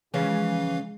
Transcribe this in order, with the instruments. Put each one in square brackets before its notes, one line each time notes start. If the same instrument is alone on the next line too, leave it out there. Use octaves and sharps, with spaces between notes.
[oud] C#3 C#4 [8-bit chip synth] E3 F5 [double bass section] F3 G#3